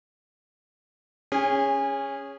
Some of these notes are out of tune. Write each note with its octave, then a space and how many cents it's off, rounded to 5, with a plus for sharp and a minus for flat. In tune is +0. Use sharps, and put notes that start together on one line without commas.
C#4 +0 G#4 -20 G#5 -45